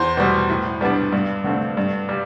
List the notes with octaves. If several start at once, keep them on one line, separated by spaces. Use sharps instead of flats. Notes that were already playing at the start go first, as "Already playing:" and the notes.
Already playing: E2 C5
B2 G3
A2
G3 B3 D4
G2
D3 A3 C4
G2
G3